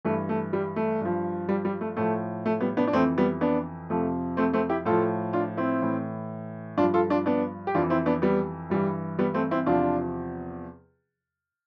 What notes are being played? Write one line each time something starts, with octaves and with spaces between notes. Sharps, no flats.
G2 E3 A3
A3
G3
A3
G2 F3
G3
G3
A3
A2 F3 A3
A3
G3 B3
B3 D4
D4
F2 E3 A3 C4
G3 B3
B3 D4
F2 C3 F3 A3
A3 C4
A3 C4
E4 G4
A2 F3 F4 A4
D4 F4
C4 E4
A2 E3
G2 F3 D4 F4
F4 A4
D4 F4
B3 D4
G4
F2 E3 D4 F4
C4 E4
B3 D4
G3 B3
G2 E3 G3
G3 B3
A3 C4
C4 E4
E2 C3 F3 D4 F4